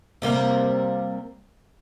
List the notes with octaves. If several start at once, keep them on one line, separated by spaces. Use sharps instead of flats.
C3 G3 A#3